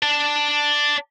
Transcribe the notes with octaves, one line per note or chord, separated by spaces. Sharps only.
D5 A5